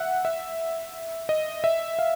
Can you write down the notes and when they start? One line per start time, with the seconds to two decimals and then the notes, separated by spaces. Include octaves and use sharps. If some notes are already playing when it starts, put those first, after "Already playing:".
Already playing: E5 F#5
0.25 E5
1.29 D#5
1.64 E5
1.99 F5